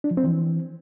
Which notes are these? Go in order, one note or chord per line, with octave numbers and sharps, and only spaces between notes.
D4
F3
C4
E3